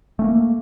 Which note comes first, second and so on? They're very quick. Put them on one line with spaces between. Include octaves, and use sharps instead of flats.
A3 C#4 A#3